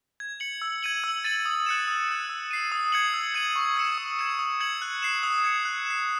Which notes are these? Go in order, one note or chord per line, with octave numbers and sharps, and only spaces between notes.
G#6
C#7 F#7
E6
G#6 D#7 F#7
E6
A6 D#7 F#7
D#6
F#6 C#7 E7
D#6
F#6 C#7
E6
C7 D#7
D#6
G#6 C#7 F#7
E6
G#6 D#7 F#7
C#6
E6 G#6 C#7 E7
D#6
G#6 C#7 E7
D#6
G#6 C#7 F#7
F#6
C7 E7
D#6
G#6 C#7
F#6
C7 E7